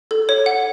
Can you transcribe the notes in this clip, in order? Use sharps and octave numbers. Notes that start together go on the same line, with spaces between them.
A4
C#5
F#5